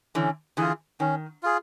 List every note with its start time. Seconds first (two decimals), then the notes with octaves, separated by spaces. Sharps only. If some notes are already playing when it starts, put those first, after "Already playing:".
0.15 D3 E3 C#4
0.57 D3 E3 F4 G#4
1.00 D#3 C#4
1.43 F4 G#4